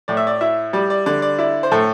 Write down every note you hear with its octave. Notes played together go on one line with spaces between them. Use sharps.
A2 D5
E5
D5
E4 E5
G3 D5
D5
D3 D5
D5
E4 D5
C5
A2 A4